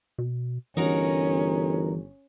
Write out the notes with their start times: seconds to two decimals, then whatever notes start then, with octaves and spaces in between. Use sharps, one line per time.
0.18 B2
0.77 G1 E3 C#4 D#4 F#4 A#4